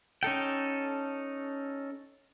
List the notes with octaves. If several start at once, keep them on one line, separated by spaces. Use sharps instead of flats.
C#4 D#4 A4 G5